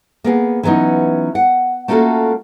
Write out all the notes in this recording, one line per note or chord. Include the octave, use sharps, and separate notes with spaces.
A#3 B3 G#4
E3 F#3 B3 C#4 D#4
F#5
A3 A#3 C#4 F4 F#4 A4